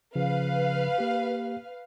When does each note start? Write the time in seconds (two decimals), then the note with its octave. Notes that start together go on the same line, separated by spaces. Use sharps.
0.15 C#3 F3 B4 F5
0.98 A#3 G4